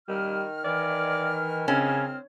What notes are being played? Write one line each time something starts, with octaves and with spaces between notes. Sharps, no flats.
D#3 G3 F6
E3 D5
C#3 C4 C#4